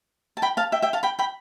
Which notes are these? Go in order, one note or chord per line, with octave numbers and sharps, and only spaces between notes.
A5
G5 B5
F5 A5
E5 G5
E5 G5
F5 A5
G5 B5
G5 B5